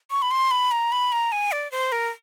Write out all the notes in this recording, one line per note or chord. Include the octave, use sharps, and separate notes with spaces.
C#6
B5
C6
B5
A#5
B5
A#5
G#5
D5
C5
A#4